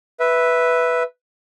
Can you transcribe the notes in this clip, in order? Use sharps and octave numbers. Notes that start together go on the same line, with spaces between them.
B4 E5